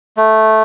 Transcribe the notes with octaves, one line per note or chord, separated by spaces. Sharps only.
A3